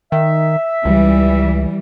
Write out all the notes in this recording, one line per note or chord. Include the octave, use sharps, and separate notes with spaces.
D#3 E5
C#2 E3 G3